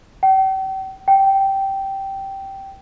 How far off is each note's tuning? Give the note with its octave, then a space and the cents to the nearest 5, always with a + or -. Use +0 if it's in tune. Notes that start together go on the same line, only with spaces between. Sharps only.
G5 -40
G5 -10